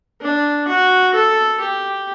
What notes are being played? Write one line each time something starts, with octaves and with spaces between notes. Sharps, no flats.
D4
F#4
A4
G4